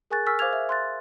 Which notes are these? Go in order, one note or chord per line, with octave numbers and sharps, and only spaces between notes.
G#4 A#4 G#5 C#6 F#6 A6
A#4 G#5 C#6 E6 F6 B6
C5 F5 D6 F6 G#6 F7
E5
C6 F#6 A6